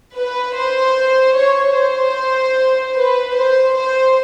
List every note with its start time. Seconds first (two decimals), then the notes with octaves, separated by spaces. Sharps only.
0.16 B4
0.56 C5
1.36 C#5
1.76 C5
2.96 B4
3.35 C5
3.75 C5